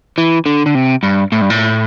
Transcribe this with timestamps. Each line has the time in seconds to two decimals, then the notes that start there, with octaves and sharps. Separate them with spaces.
0.18 E3
0.46 D3
0.66 D3
0.75 C3
1.03 G2
1.32 A2
1.41 G2
1.50 A2